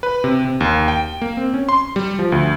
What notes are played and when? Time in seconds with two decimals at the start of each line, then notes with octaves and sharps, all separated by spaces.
0.03 B4
0.24 C3
0.45 C3
0.60 D#2
0.88 G5
1.22 A#3
1.37 C4
1.54 C#4
1.69 C6
1.96 G3
2.19 F3
2.32 D2